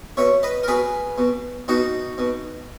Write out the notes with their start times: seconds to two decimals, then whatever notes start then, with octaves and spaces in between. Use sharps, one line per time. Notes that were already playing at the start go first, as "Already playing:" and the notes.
0.17 B2 C#5 E5
0.43 B4 D#5
0.63 A#4
0.68 B2 G#4 B4
1.18 B2
1.68 B2 D#4 F#4
2.18 B2